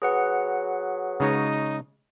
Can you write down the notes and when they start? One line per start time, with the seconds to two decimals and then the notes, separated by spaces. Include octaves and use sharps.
0.02 F#3 G#4 B4 F#5
1.20 C#3 G#3 D#4 C#5